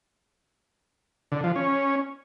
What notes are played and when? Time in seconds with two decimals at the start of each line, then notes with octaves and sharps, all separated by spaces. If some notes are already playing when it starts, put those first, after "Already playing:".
1.32 D3
1.44 F3
1.56 C#4